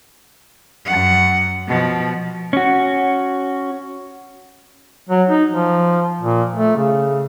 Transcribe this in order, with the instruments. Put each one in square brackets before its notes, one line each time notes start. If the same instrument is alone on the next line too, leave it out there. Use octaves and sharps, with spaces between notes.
[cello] F#2 F#5
B2 F3
[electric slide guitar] C#4 F#4
[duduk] F#3
D#4
F3
A#2
A3
C#3